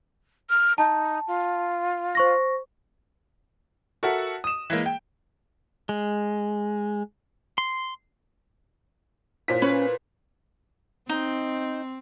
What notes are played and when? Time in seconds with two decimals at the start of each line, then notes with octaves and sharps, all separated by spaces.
0.50 F6
0.78 D#4 A5
1.28 F4
2.15 C5 C#6 A#6
4.03 F#4 A4 A#4 E5 F#5
4.44 D#6 E7
4.70 E3 G#3 A#3
4.86 G5
5.89 G#3
7.58 C6
9.48 A#2 E4 C5 C#5 B6
9.62 C#4 B4
11.09 C4 D#4